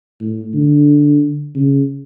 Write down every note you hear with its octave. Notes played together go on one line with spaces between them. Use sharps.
A2
D3
C#3